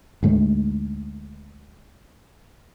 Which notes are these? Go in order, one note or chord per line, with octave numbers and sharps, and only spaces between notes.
D2 G#2 A3